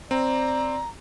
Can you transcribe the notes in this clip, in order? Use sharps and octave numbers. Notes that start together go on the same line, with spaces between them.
C4 D5 A#5